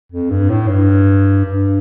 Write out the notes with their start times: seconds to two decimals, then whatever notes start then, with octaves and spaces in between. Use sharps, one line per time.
0.12 F2
0.30 G2
0.50 A2
0.68 G2
1.45 G2